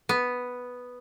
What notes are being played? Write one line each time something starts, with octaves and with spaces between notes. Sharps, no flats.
B3